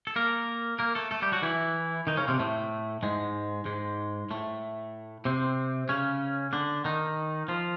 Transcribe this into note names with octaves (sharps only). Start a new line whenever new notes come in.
A4
A#3 A#4
A#3 A#4
A3 A4
A3 A4
G3 G4
F#3 F#4
E3 E4
D#3 D#4
C#3 C#4
C3 C4
A2 A3
G#2 G#3
G#2 G#3
A2 A3
C3 C4
C#3 C#4
D3 D4
D#3 D#4
F3 F4